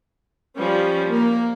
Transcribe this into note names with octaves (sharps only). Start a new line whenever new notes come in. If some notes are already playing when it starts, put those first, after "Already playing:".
F3 G3 C#4
A#3